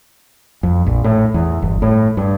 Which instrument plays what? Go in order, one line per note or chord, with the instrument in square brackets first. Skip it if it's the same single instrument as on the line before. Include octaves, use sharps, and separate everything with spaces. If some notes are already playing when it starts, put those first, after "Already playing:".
[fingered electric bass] F2
A#1
A2
E2
G1
A2
G2